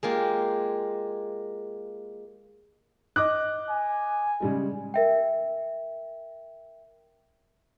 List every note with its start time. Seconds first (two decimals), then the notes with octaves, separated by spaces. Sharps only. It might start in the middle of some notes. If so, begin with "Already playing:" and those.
0.03 G#3 A#3 F4 G4
3.16 D#5 D6 F#6
3.70 G#5
4.40 C#3 G3 G#3
4.94 A#4 E5 G5